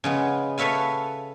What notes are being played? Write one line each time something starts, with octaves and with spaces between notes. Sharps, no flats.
C#3 G#3 B3
A4 B4 C#5 E5 F5 G#5